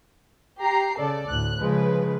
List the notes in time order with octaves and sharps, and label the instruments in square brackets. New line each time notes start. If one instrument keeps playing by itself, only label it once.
[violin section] G4 A#5 C7
[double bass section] C#3 [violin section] A4 D5
[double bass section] D2 A2 [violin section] F#6
[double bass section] C#3 F3 G#3 [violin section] B4